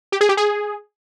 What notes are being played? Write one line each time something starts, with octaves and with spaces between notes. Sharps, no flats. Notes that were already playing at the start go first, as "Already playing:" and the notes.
G4
G#4
G4
G#4